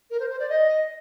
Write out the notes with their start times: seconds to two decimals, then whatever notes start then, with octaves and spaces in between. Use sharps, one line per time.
0.10 A#4
0.20 C5
0.30 C5
0.40 D5
0.49 D#5